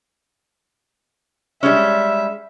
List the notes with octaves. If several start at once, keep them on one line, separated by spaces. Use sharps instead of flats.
G3 G#3 C#4 E5